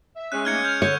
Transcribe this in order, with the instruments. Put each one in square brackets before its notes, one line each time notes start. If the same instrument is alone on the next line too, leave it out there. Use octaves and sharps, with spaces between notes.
[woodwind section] E5
[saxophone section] G#3 C#4 [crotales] F#6
[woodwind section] A3 A#3 D#4 [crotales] F6 G#6 C#7
[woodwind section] F6 [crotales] G6
[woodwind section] D3 [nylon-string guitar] C#5 [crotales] C#6 G6